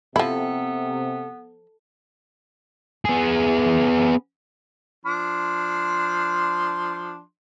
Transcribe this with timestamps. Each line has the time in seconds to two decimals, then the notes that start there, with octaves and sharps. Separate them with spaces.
0.16 C3 F3 B3 E4 A4
3.05 B3 G#4
5.05 F3 D4 C6